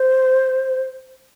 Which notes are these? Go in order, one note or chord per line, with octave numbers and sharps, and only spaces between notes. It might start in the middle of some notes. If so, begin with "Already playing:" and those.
Already playing: C5